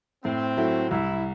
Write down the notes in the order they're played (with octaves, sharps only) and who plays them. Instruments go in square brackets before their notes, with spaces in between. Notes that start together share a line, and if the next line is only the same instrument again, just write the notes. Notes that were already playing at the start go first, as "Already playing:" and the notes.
[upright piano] A2 [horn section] C4
[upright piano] F#3 A3 E4
[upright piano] C2 [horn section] E4